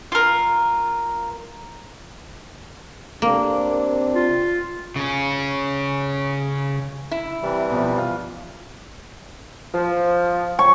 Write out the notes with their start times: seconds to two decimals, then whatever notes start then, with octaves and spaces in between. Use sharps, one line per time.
0.12 F4 A#4
3.22 C3 A#3 C4 D4
4.14 F4
4.96 C#3 C#4
7.11 E4
7.43 C3 E3 G3
7.70 B2 F3
7.98 F4
9.74 F3
10.59 C#5 C#6